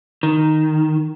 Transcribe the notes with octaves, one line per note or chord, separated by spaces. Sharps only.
D#3